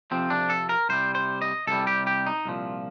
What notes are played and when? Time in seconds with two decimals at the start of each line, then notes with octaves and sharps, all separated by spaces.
0.11 F2 C3 F3 C4
0.30 D4
0.50 A4
0.69 A#4
0.89 C2 C3 G3 C5
1.15 C5
1.42 D#5
1.67 C2 C3 G3 A4
1.87 G4
2.07 G4
2.26 D#4
2.45 C2 A#2 F3